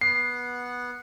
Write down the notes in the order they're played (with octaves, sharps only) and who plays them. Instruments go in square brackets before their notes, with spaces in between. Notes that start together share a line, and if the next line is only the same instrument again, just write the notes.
[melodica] B3 F#5 [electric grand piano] C7